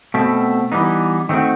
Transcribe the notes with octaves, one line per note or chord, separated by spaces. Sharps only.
B2 A3 C4
E3 G3 B3 D#4
D#3 A3 C4 F#4